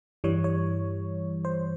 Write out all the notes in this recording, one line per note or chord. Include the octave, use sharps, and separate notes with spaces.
G2 E3 G3 C#5
C#5
C5